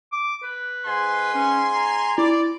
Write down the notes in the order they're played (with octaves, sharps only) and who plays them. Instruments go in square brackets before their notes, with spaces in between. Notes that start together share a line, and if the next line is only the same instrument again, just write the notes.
[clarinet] D6
B4
[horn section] G#2 G#5 C6
[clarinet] C#4
A#5
[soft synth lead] E4 [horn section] D5